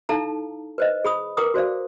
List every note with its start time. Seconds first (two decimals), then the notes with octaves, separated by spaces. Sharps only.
0.09 D#4 E4 A4 F5 A5 A#5
0.78 B4 C5 D#5
1.04 G#4 B5 D#6
1.37 A#4 B4 G5 A#5 D6 D#6
1.54 F#4 C5 D5 F5